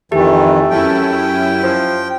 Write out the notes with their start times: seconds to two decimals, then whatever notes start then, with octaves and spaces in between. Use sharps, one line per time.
0.12 F2 D#3 E3 A3 G4
0.70 F#2 C#4 E4 G5
1.63 F3